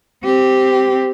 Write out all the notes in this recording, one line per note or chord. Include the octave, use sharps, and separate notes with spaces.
C4 G4